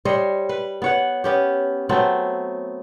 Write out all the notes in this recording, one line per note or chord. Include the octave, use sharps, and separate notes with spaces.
G3 C5 C#5 D#5
B4
B3 C#5 F#5
B3 C#4 G4
F#3 A3 B3 C4